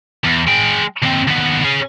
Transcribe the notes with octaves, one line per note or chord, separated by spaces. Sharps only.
E2
G#3 G5
D#2 C4
D#2 B3
C#4 G#4